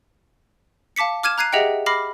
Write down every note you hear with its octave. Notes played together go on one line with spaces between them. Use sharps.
F5 A5 D6 B6 C#7
D6 F6 G#6 D#7 E7
A#5 F#6 G#6 C7 D#7
G4 G#4 D#5 E5 F#5 G5
B5 D6 F6 A#6 C7